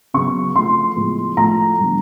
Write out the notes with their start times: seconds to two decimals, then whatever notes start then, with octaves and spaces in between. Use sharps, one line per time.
0.14 C#3 F#3 B3 C#6
0.55 C#3 F3 A3 C6
0.96 A2 F3 G#3 B3
1.37 A2 F3 A3 A#5
1.78 D3 G3 B3